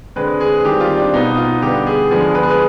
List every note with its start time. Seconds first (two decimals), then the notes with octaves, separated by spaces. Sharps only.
0.16 D3 G#3 C4 B4
0.40 G#4
0.64 D#3 G3 C4 G4
0.81 F4
0.97 D4
1.13 B2 B3 D#4
1.37 F4
1.62 D3 G3 B3 G4
1.87 G#4
2.11 D3 F3 G#3 B3 G#4
2.35 B4
2.43 G#4
2.50 B4